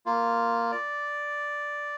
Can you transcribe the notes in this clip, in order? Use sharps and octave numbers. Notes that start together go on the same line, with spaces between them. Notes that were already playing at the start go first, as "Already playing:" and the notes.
A#3 F4
D5